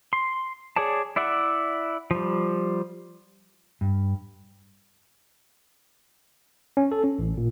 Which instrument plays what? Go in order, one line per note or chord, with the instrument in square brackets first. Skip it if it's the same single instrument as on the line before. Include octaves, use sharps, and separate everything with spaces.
[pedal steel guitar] C6
G#4 C#5 D5 A5
E4 D5 E5 F#5
F3 G3
[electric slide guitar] G2
[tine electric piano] C#4
A4
C#4
A1
A#2